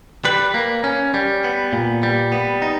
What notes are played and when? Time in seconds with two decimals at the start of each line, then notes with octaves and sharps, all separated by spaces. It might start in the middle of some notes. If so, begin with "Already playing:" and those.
0.25 G3 B4
0.54 A#3
0.84 C#4
1.14 G3
1.44 B3
1.73 A#2
2.03 G3
2.32 B3
2.62 D#4